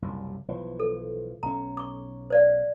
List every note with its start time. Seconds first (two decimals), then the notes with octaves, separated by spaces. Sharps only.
0.02 F#1 C2 F#2
0.48 B1 E3 F3
0.80 A4
1.43 B1 C#4 A#5
1.77 C#6 D6
2.30 C5 D5 F5